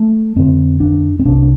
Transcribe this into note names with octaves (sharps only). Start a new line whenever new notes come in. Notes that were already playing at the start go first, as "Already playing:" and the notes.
Already playing: A3
F2 D3 C4
D4
C4
C2 C3 D4